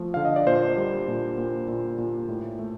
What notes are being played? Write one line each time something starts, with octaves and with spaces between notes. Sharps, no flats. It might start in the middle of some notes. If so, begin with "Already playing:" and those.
Already playing: F3 A3
D3 F5
D#5
D5
A#2 C5
G3
A#2
A#2
A#2
A#2
A2
A3